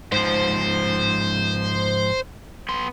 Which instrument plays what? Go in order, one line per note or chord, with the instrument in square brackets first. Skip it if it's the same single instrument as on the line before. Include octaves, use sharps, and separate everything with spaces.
[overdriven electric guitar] G#2 F3 [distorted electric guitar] C5
[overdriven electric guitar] B3 C6